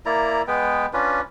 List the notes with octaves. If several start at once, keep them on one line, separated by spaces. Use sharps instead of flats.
A#3 E4 D5 A#5
G#3 B3 B4 G5
C#4 D4 F4 B4